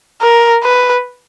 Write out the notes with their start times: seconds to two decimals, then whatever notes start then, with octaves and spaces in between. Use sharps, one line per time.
0.21 A#4
0.63 B4